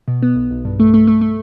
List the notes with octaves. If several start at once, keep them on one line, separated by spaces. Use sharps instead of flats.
B2
B3
B1
B1
G2
A3
A3
A3
A3